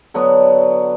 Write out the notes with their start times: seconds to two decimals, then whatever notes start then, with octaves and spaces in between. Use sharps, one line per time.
0.14 D3 F#3 B3